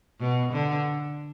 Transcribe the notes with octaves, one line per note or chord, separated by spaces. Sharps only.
B2
D3